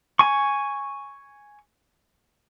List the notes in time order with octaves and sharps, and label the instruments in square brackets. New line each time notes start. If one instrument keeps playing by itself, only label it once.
[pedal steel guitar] G#5 C#6